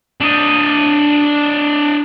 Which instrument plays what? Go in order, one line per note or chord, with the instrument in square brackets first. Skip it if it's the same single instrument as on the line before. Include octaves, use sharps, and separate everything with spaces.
[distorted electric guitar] D4 D#5